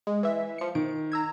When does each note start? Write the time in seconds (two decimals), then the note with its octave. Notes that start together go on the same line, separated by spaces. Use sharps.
0.07 G#3
0.23 E3 E5
0.58 F3 C#7
0.75 D#3 D7
1.12 A#5 E6 G#6